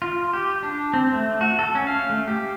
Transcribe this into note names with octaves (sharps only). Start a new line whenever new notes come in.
F4
G4
D4
C4
A3
F#4
A4
C#4
F5
A3
G4